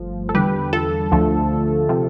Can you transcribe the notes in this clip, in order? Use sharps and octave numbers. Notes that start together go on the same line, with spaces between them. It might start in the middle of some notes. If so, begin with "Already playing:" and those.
Already playing: G1 G2 F3 A3
A4
E2 D3 G3 G4 B4
F4 A4
D2 D3 F3 A3
C3 F3